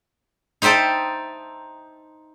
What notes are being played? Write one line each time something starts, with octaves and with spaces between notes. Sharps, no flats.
D#4 C5 E5 G5 A5